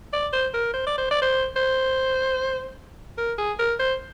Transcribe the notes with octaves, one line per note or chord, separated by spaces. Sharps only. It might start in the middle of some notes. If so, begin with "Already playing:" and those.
D5
C5
A#4
C5
D5
C5
D5
C5
C5
A#4
G#4
A#4
C5